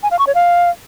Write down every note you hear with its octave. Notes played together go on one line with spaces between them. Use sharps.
G#5
F5
C#6
C#5
F5